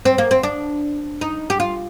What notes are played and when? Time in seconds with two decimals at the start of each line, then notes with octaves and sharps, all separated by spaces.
0.05 C4
0.18 A#3
0.31 C4
0.43 D4
1.21 D#4
1.50 G4
1.60 F4